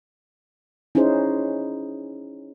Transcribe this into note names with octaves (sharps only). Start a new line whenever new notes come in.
C#4 D#4 E4 G#4 C5